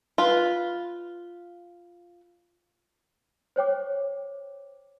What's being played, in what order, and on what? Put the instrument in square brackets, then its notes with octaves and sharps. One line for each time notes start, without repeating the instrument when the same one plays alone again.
[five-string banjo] F4 B4
[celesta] C5 C#5 G5 D6